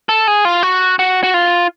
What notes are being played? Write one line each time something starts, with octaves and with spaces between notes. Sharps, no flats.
A4
G#4
F4
F#4
F#4
F#4
F4